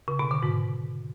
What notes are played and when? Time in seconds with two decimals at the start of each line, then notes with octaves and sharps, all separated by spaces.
0.08 C#3
0.19 B2
0.31 D3
0.43 G#2